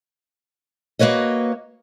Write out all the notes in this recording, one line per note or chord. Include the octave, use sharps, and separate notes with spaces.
A#3 F#4 B4 C#5 D#5